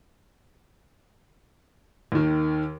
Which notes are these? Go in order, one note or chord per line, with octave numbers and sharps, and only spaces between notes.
D#2 D#3